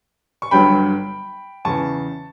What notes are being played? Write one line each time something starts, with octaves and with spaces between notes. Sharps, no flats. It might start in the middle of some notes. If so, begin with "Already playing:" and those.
C#6
G1 G2 F#3 G5 B5
E2 C#3 E3 A5 C#6